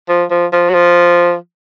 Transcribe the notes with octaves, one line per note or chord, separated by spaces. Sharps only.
F3
F3
F3
F#3
F3